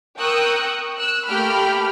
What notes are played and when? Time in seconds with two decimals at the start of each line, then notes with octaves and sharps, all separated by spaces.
0.18 A#4 G5 C#6 D#6 E6 F#6
0.98 E6 F#6
1.27 A3 A#3 G4 G5 B5 F6